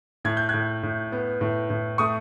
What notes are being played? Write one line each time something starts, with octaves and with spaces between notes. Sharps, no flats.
A2 G#6
G6
A2 F#6 G#6
A2
B3
A2
A2
A3 C#6 D#6